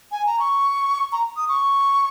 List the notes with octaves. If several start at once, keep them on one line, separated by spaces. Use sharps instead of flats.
G#5
A#5
C#6
A#5
D#6
C#6